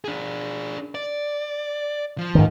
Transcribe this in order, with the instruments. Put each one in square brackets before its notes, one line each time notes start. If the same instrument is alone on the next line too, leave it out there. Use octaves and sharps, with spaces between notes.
[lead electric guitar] D4 G#4
D5
F3
[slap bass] G#2 D#3